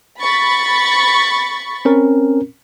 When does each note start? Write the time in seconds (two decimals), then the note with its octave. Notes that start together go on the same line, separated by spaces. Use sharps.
0.20 B5 C#6 A6
1.85 C4 C#4 A#4